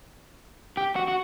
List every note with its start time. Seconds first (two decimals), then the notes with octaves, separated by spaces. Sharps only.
0.77 G4
0.96 F#4
1.08 F#4